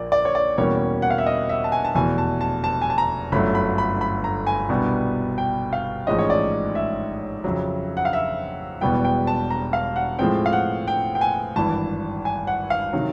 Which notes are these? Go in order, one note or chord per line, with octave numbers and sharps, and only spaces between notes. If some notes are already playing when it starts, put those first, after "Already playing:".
Already playing: A#1 A#2 A#3 D5
D5
C#5
D5
E2 B2 G3 A#3 C#4 C#5
F#5
F5
E5
D#5
E5
A5
G#5
A5
F1 E2 B2 G#5
A5
A5
A5
G#5
A5
A#5
G1 F#2 D3 F#3 A3 B5
B5
B5
B5
A#5
G#5
C2 B2 G3 B3 D4
G5
F5
A1 G#2 F3 G#3 C#4 D#5
C#5
D5
E5
F2 C#3 F#3
F#5
F5
E5
E1 E2 B2 G3 B3 G5
G5
A5
A#5
F5
F#5
A2 F3 G#3 C4 G5
F5
F#5
G5
G5
G#5
G#1 G2 E3 A5
G#5
F#5
F5
C3 D#3 F#3